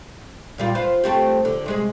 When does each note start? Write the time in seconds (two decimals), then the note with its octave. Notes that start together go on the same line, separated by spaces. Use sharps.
0.58 A#2 G3 F4
0.75 F4 B4 C5
1.04 A3 C4 G4
1.45 D3
1.66 C3 G#3 G#4